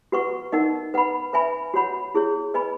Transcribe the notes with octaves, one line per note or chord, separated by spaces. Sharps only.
F#4 B4 F#5 C#6
D#4 A#4 D#5 F#5
B4 F#5 B5
B4 E5 G#5 B5
F#4 C#5 F#5 B5
E4 G#4 C#5
B4 D#5 G#5 B5